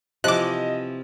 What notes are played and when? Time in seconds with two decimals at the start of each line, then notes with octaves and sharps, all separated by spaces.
0.24 C3 E3 F3 D#5 D6 F#6